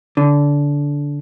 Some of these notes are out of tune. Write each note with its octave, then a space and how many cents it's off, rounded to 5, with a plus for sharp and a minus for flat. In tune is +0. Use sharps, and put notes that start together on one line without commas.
D3 -20